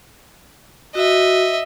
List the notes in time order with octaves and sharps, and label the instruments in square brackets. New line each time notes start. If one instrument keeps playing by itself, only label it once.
[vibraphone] F#4 [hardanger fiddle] D#5 E5